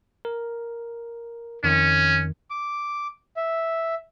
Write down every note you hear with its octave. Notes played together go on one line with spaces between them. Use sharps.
A#4
F2 D#3 C#4
D6
E5